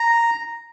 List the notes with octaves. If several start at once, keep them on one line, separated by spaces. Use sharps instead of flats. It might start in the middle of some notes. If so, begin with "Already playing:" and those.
Already playing: A#5